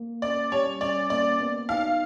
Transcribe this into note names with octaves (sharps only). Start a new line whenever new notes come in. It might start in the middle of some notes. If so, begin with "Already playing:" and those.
Already playing: A#3
C#4 D5
G3 C#5
C#4 D5
A#3 D5
B3
D#4 F5